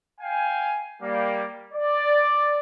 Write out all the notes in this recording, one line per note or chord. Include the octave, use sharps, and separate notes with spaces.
F5 G5 G#5
G3 A#3
D5